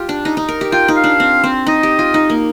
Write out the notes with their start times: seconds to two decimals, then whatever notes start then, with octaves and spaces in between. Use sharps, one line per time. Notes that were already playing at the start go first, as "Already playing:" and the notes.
Already playing: F4 G4
0.09 D4
0.25 D#4
0.37 D#4
0.49 A#4
0.61 G4
0.72 F4 G5
0.88 D#4
0.97 F5
1.04 D4
1.20 C4
1.44 C4
1.66 D#4 D#5
1.83 G4
1.99 F4
2.14 D#4
2.30 A#3